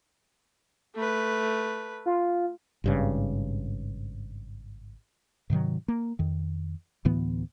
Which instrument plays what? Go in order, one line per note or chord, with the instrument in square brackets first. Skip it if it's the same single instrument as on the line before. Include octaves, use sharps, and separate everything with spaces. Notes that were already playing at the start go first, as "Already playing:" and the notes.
[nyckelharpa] A3 B4
[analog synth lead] F4
[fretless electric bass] G#1 G2 C#3
G#2 C3 D#3 F#3
A#3
F2 D#3
D2 A2 E3 B3